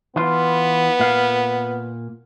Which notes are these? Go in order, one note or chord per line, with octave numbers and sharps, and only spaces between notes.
E3 B3 F4
A#2 F5